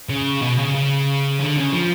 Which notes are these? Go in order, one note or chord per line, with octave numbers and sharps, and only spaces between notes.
C#3
B2
C#3
C#3
D3
C#3
F3